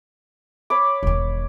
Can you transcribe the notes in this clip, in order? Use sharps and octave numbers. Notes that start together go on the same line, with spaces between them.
C#5 B5 D6
E1 D#3